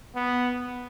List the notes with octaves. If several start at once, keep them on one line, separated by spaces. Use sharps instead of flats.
B3